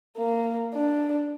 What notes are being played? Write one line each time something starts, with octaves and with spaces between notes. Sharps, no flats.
A#3
D4